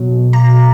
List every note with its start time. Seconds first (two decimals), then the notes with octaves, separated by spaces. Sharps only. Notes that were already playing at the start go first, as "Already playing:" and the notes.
Already playing: B2 F#3
0.33 A#5